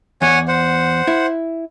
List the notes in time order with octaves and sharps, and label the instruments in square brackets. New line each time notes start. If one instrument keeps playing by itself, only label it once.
[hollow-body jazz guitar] E2 [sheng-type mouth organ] C#5 F#5 G#5
[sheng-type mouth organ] C5 F#5
[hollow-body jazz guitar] E4